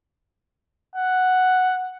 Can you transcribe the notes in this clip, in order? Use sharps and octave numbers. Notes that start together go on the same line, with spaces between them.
F#5